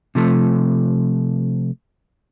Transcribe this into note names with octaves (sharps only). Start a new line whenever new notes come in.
C3 F3 A3